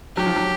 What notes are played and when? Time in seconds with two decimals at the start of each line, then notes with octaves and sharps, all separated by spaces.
0.16 F#3 G4
0.26 F3
0.36 F#3